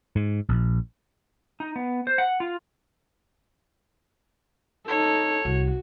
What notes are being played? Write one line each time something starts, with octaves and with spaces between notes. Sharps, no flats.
G#2
A#1
D#4
B3
C5
F#5
F4
D#4 A4 C#5
C2 F#4